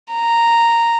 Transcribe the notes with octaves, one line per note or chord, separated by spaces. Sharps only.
A#5